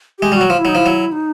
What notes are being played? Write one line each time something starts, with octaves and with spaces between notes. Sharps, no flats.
G#3 G4
G3 F#4
F#3
F3 F4
E4
F#3 D#4
F3 E4
F#3
D#4